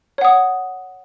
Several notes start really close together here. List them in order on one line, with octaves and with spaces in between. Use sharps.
C#5 F#5 D#6